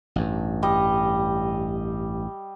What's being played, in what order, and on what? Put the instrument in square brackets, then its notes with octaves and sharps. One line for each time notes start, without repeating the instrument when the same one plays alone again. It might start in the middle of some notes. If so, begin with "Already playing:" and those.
[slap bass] A1 G2
[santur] G3 D#5